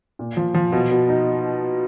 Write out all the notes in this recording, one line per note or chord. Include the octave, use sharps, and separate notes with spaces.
A#2
F3
F3
B2
B2
D#4